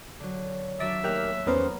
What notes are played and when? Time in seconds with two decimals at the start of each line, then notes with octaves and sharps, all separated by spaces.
0.20 D3 F#3
0.80 D#3 F#3 D4 D5 E5 D6
1.04 D#2 A2 D#4 G4 A#4 F6 F#6
1.46 E2 D#3 B3 C#4 A#4 C5